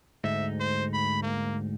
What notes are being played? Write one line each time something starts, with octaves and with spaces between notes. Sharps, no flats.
D2 G#2 D#4 E5
C5
B5
A#3